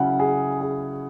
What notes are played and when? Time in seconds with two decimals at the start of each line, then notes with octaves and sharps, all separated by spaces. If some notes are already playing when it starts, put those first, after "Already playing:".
Already playing: C#3 F#3 C#4 E4 F#5
0.19 G#4
0.61 G#4